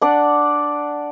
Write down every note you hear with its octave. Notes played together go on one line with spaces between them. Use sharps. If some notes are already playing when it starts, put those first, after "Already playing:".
D4 D5 F#5